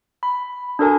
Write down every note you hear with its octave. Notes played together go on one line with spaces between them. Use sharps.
B5
D4 F#4 A4 A#4 G#5